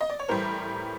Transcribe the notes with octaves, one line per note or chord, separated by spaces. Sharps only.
D#5
D5
C#5
A2 E3 G3 A#4 C5